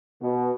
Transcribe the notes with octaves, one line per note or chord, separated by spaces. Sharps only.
B2